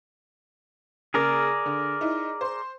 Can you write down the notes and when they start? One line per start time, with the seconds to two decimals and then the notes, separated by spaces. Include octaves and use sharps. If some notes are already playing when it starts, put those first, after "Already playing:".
1.14 C#3 A#3 G#4 A#4 D5
1.66 D3
2.01 D#4 E4
2.41 C5 C6